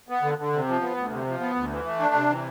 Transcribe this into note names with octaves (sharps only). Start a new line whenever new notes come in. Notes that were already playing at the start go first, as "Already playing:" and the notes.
B3
D3
D3
C3
F3
B3
D2
C3
F3
B3
D2
E3
A3
D4
C3
E3